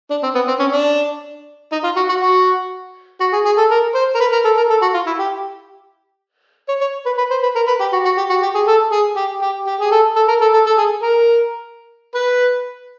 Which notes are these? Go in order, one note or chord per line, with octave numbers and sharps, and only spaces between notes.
D4
C4
B3
C4
C#4
D4
D#4
F4
F#4
F#4
F#4
F#4
G#4
G#4
A4
A#4
C5
A#4
B4
A#4
A4
A#4
A4
F#4
F4
E4
G4
C#5
C#5
B4
B4
C5
B4
A#4
B4
G4
F#4
F#4
G4
F#4
G4
G#4
A4
G#4
G4
G4
G4
G#4
A4
A4
A#4
A4
A4
A4
G#4
A#4
B4